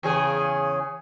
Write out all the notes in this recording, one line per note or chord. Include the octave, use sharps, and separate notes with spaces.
E2 C#3 G#4